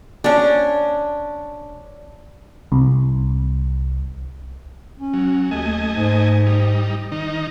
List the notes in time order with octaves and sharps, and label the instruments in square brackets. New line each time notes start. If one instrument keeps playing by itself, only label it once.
[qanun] C#4 D4
[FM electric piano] C2
[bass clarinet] C#4
[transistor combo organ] F#3
[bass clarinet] D#2 [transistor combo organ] A3 D#5 G#5
[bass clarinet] G#2
[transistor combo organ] G3 D#4
D#3 D#4